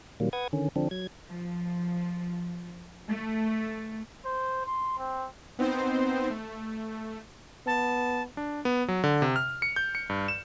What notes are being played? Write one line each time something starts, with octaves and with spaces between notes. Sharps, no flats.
A#2 D#3 F#3 G3 A#3
B4 F#5 D#6 G#6
D3 D#3 C#4
D3 F3 C4 D4
F#3 G#6
F3
A3
C5
C6
C4
B3 C4 D#4 C5
A3
B3 A5
D4
B3
F#3
D3
C3
F6
C#7
G6
C#7
G2
E7